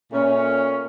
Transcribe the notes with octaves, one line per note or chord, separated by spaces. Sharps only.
A#2 A3 C#4